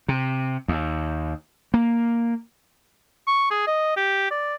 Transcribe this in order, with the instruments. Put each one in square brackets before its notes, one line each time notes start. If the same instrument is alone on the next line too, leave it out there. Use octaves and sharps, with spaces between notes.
[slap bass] C3
D#2
A#3
[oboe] C#6
G#4
D#5
G4
D5